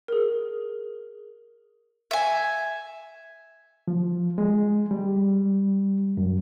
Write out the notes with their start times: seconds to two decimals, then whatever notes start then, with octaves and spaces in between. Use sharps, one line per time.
0.08 G#4 A#4
2.11 E5 G#5
3.88 F3
4.38 G#3
4.91 G3
6.17 F#2